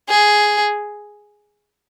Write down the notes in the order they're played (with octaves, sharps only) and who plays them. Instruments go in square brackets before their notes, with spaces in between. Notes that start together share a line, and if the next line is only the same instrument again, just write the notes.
[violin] G#4